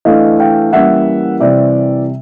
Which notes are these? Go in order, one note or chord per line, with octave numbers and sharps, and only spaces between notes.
E3 A3 D4 D#5 F5
F5 G5
E3 G3 A#3 C#4 E5 F#5
C3 E3 G3 C4 D5 E5